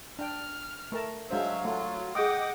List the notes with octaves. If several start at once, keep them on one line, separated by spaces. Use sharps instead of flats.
D4 G5 F6
A3 A#4 A5
F#3 G#3 D4 C5 E5 F5
A3 F4
G#4 D#5 F#5 G5 D6 D#6